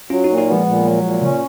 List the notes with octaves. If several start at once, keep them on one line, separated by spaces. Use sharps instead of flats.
F#3 C#4 F4
A#2 D#4 F#4
D#4 F#4
F3 G#3 B3
A#2
F#3
A#2
C#3 C#4